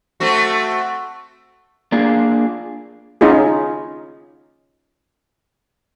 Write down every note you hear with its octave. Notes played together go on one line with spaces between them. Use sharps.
A3 C4 F#4
A#3 D4 F4 G#4
C#4 D#4 F4 G#4